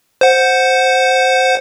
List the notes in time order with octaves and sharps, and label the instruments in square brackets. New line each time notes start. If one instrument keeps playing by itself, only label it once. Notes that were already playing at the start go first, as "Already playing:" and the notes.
[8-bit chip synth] C5 F#5